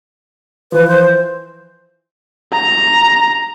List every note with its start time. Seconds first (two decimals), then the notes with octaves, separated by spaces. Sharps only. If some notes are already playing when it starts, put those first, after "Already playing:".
0.72 E3 F3 B4
0.87 C5
2.53 A#5